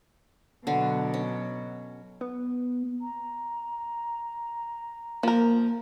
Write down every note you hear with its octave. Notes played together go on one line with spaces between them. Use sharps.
B2 D3 F#3 D4
C#4
B3
A#5
F3 A#3 A#4